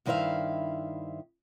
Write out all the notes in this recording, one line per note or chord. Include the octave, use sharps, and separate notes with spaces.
G2 D#3 E4 C5 E5 F5